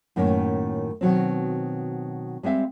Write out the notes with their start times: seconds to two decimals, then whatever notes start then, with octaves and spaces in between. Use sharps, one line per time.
0.16 F#2 A2 D#3 A#3 C#4
1.01 B2 D#3 F#3 C4
2.43 G3 G#3 C4 E5 F5